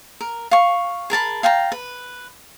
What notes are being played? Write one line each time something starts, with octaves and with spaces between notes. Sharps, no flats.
A#4
F5 C#6
G#4 A#4 A5 B5
F5 G5 A5 A#5
B4